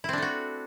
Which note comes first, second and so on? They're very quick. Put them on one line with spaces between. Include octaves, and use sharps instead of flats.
E4 C4 D4 A3 F#4